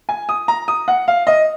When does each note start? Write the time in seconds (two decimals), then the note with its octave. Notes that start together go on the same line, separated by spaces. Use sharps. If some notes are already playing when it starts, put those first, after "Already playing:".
0.09 G#5
0.29 D#6
0.48 A#5
0.68 D#6
0.88 F#5
1.08 F5
1.27 D#5